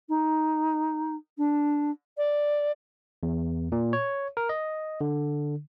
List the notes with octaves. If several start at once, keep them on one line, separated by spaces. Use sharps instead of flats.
D#4
D4
D5
E2
A#2
C#5
A#4
D#5
D3